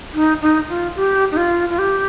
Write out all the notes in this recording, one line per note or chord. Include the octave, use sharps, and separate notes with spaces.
D#4
D#4
F4
G4
D#4
F4
F4
G4